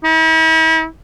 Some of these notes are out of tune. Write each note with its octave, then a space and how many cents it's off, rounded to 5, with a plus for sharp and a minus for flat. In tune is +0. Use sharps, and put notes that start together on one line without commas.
E4 -45